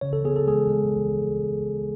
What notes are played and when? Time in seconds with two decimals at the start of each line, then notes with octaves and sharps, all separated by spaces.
0.01 C#3 C#5
0.13 A4
0.25 B3 G#4
0.36 A4
0.47 G#3 G#4
0.69 G#3